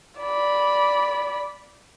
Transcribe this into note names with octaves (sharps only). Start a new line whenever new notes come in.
D5 B5